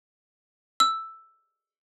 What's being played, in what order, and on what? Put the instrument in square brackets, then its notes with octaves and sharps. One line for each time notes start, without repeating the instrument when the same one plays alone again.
[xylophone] E6